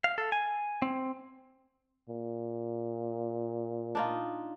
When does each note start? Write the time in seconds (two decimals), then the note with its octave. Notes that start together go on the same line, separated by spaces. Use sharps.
0.04 F5
0.18 A4
0.32 G#5
0.82 C4
2.09 A#2
3.95 D4 D#4 F4